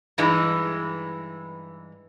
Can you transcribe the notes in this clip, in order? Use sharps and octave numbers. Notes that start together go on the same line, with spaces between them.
G2 E3 G#3 D#4